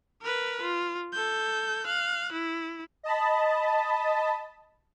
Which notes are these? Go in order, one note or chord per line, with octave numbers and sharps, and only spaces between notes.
A#4 B4
F4
A4 G6
F5 F#6
E4
D#5 A5 B5